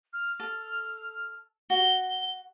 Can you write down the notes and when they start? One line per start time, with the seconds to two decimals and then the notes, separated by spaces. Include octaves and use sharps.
0.13 F6
0.40 A4
1.70 F#4 G7